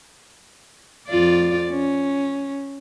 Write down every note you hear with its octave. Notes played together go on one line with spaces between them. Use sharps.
F2 F4 D5
C#4